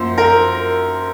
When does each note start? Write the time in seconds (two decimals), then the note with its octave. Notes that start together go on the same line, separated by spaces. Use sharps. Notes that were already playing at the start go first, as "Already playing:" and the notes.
Already playing: F#2 F3 A#3 C5
0.18 A#4